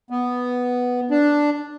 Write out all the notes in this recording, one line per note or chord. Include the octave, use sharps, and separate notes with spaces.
B3
D4